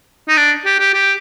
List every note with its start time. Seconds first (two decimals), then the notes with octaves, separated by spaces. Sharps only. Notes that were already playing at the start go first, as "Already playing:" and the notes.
0.28 D#4
0.37 D4
0.66 G4
0.79 G4
0.94 G4